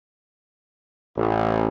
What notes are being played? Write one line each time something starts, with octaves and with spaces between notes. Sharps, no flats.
A1